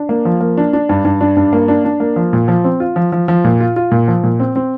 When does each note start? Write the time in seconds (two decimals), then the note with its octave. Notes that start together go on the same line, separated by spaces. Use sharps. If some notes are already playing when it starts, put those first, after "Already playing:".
Already playing: D4
0.09 A#3
0.25 F3
0.40 A#3
0.57 D4
0.73 D4
0.89 G2
1.05 G2
1.21 D4
1.37 G2
1.53 A#3
1.68 D4
1.85 D4
2.00 A#3
2.16 F3
2.33 A#2
2.48 F3
2.64 C4
2.80 F4
2.96 F3
3.12 F3
3.28 F3
3.44 A#2
3.60 F4
3.76 F4
3.92 A#2
4.08 F3
4.24 A#2
4.40 C4
4.56 C4